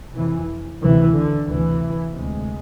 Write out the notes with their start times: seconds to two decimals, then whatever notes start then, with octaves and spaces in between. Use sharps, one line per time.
0.14 F2 C3 E3
0.81 D2 C3 E3
1.14 D3
1.46 D2 C3 E3
2.13 D2 C3 G#3